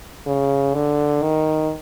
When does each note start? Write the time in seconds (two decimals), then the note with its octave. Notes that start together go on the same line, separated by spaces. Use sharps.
0.26 C#3
0.74 D3
1.22 D#3